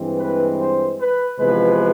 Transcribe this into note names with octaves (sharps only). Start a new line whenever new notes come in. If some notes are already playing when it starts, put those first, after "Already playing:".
Already playing: G2 E3 G#3 C4
B4
C5
B4
E2 C3 F3 G#3 B4